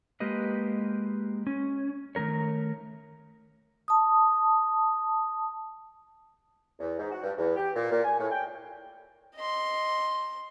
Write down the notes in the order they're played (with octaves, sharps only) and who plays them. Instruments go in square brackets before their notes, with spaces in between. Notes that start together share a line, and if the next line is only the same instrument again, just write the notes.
[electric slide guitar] G#3 A#3 G4 B4 D#5
C#4
D#3 A3 B3 A#4 C#5
[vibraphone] A5 D#6
[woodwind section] E2
G#2
F#4
G2
E2
G4
A#2
A#2
G#5
A2
G5
[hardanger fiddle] D#5 C6